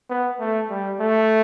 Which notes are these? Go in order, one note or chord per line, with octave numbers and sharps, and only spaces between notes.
B3
A3
G3
A3